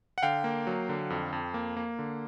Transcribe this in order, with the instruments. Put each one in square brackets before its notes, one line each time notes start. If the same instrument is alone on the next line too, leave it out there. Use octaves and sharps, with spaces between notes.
[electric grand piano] F#5
D3 F5 G5
A#3
F#3
D3
F2
F2
A#3
A#3
D3